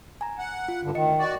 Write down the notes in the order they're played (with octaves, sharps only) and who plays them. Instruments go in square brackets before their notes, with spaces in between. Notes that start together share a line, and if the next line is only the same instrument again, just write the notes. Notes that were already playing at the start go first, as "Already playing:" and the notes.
[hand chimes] G#5 A#5
[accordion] F#5
[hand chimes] F4
[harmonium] G2 D3
[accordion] D2 [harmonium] D#3 [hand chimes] D#5 C#7
[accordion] F#4 D5